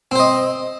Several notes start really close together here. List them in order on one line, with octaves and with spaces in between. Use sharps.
C4 C5 D#5